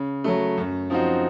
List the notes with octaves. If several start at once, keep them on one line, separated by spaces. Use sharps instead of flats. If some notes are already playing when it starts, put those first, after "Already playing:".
Already playing: C#3
F#3 A3
F#2
F3 C4 D#4 F#4